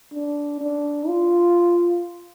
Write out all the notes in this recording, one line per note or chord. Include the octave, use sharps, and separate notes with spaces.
D4
D4
F4